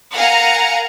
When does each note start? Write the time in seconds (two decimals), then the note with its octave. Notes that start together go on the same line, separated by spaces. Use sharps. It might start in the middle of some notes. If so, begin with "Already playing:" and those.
0.12 A#4 F5 F#5 G#5 A#5